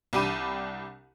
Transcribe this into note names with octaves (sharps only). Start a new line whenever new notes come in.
C2 D4 G4 B5 D6 D#7